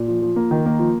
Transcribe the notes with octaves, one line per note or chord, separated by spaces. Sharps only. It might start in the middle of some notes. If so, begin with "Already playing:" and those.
Already playing: A#2
F3
F3
A#3
D#3
A#3
F3